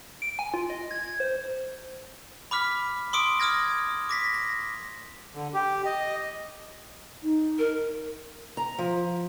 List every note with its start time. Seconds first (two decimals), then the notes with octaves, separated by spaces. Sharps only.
0.22 D7
0.39 G#5
0.54 F4
0.70 D#5
0.91 G#6
1.20 C5
2.51 B5 D6 F6 B6
3.13 C6 D6 D#6 D7
3.40 D6 D#6 F6 G#6 A#6
4.09 D6 A#6 B6
4.34 A#6
5.35 D3
5.54 G4
5.85 D#5
7.23 D#4
7.59 A#4
8.57 A#5
8.78 F3